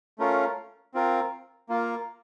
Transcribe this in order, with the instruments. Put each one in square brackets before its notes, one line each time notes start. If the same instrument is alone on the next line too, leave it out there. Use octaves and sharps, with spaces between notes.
[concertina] A3 C#4 F4 A#4
C4 F4 A#4
A#3 F4 A#4